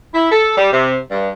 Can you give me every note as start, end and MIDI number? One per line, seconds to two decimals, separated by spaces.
0.14 0.29 64
0.31 0.56 69
0.58 0.70 55
0.72 0.96 48
1.10 1.29 43